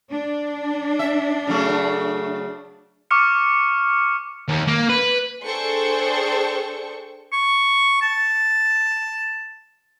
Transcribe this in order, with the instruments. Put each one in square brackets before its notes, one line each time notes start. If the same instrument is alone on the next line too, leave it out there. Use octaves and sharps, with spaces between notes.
[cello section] D4
[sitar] E5
C#3 F#3 A3
[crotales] C#6 D6 F6 C#7
[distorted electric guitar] D#2
A#3
B4
[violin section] D4 G#4 A4 C5 G5 C#6
[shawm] C#6
A5